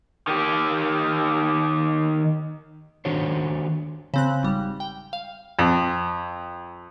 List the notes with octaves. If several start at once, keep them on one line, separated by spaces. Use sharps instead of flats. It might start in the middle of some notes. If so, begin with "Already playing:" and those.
D#3 G4
D#3 D4 F#4 C5 C#5
C#3 C4 F#6
G#1 G3
G5
F5
F2